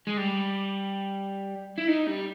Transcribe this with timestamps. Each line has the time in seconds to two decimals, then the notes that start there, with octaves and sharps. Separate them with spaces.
0.07 G#3
0.17 G3
1.78 E4
1.88 D#4
2.07 G3